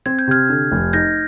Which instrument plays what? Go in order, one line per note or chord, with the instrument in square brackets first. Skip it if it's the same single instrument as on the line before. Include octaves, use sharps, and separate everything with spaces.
[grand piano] C4 [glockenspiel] G#6
[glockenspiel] G6
[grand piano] C3 [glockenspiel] F6 G#6
[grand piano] D3
F1
[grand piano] D#4 [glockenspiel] G6 A#6